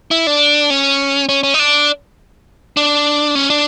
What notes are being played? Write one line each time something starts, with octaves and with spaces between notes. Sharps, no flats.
E4
D4
C#4
C#4
C#4
D#4
D4
D4
C#4
D4